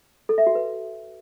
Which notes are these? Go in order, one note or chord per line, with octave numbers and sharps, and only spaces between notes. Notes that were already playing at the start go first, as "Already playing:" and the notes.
A4
E5
F#4
B4